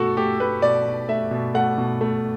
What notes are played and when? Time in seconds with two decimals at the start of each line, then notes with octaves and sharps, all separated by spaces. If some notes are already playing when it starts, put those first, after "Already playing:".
Already playing: B2 A3 F#4 A4
0.17 A3 G4
0.40 A3 B4
0.62 B2 D5
0.86 B2
1.09 A3 E5
1.31 B2
1.54 A3 F#5
1.78 B2
2.01 A3